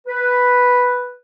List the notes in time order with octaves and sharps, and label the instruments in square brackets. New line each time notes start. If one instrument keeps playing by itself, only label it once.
[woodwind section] B4